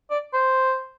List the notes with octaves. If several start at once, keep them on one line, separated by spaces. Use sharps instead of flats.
D5
C5